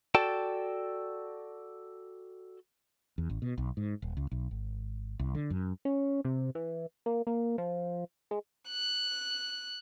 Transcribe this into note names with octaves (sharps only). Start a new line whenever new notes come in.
F#4 A4 D5 G5 A5
E2
A1
B2
B1
G#2
D#1
C#2
B1
G#1
C2
D3
F#2
C#4
C3
E3
A#3
A#3
F3
G#3
F#6